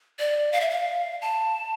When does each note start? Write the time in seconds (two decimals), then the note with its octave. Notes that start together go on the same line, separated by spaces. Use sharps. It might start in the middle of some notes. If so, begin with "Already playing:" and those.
0.19 D5
0.52 F5
0.61 E5
0.69 F5
1.21 A5